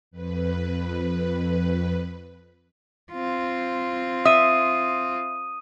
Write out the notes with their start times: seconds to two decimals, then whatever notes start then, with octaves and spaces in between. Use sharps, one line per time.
0.11 F2 B4
3.13 C4 F4
4.25 E5 D#6 D#7